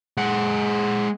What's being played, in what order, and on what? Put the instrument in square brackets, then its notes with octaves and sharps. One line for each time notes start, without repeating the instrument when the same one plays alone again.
[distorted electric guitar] G#3 F#5